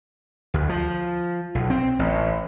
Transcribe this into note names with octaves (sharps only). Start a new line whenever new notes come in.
D2
F3
B1
C4
A1